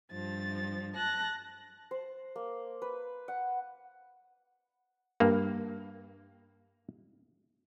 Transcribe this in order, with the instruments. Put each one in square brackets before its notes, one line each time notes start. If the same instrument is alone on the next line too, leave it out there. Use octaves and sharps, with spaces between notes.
[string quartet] G2 F3 [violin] A6
[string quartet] A5 A#6 [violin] F#6
[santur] C5
A#3
B4
F#5
[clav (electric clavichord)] G2 A#3